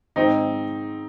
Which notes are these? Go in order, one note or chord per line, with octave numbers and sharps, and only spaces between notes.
G#2 D#3 C4 D#4